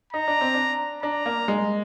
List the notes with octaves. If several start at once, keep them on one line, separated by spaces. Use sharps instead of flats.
D#4 A#5
D4
C4
D4
D4 A#5
A#3
G#3